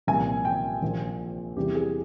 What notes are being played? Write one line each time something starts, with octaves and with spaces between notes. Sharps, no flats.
C2 A#2 F3 G#5
G5
A#1 A#2 F3
E2 C3 E3 G3 G4
G#4